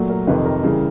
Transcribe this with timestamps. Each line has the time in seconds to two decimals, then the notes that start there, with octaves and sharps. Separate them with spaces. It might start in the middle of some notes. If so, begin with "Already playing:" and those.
Already playing: A#2 F#3 A3
0.09 A#4
0.27 F2 C3 D#3 B4
0.45 A#4
0.64 C#3 E3 G3